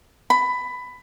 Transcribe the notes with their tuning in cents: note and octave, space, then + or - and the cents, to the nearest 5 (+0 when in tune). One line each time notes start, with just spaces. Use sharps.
B5 +15